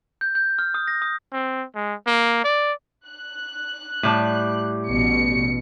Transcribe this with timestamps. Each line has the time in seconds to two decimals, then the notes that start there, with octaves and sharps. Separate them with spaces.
0.21 G6
0.35 G6
0.59 F6
0.74 D#6
0.88 A#6
1.02 D#6
1.33 C4
1.75 G#3
2.07 A#3
2.44 D5
3.07 F#6
4.03 A2 G3 A5
4.87 A1 B2 C#7